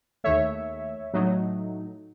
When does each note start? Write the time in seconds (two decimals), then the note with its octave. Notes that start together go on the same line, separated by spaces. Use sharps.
0.24 D#2 D#3 A3 C#5 E5
1.14 A2 F#3 A3 D#4